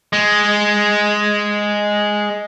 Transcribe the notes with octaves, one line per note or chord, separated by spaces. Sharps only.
G#3